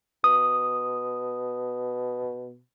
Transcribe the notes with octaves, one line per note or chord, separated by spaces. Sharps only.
B2 D#6